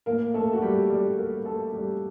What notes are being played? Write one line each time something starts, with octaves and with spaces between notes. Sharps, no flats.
A2 A#3 A#4
A3 A4
F#4
G3 G4
G3 G4
A#3 A#4
A3 A4
G3 G4